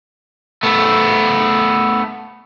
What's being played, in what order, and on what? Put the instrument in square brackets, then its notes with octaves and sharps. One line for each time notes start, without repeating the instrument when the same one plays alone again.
[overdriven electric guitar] A3 B3